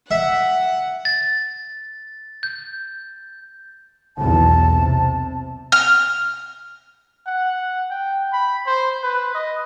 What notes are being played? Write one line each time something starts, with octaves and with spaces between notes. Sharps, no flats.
E5 F#5
A6
G6
B1 E2 A5
C3
F6
F#5
G5
B5
C5
B4
D#5